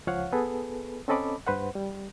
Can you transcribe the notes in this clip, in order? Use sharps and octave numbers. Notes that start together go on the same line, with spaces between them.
C#2 F3 C#5 F5 F#5
B3 G#4 A4 B4
C4 C#4 A4 D#5 B5 D6
G2 B4 C5 F#5
G3